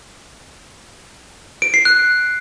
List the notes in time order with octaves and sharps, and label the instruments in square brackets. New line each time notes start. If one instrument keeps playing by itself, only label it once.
[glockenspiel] D7
C7
F#6